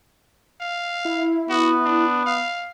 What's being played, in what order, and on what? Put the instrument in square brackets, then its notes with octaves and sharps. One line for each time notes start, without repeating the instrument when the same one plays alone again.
[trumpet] F5
[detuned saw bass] E4
[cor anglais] B3 [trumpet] F#4
[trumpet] D4
F5